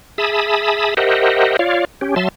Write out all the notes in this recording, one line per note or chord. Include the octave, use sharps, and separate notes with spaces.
G#4 E5 A5 B5 D#6
G4 A#4 C5 D#5 E5 F#5
F4 C#5 D5 F5
C#4 G4
F#3 E5 A5 C6